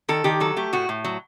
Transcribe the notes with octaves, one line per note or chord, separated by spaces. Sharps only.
D#3 A4
D#3 G4
F#3 A4
A3 G4
A2 F#4
A2
F#3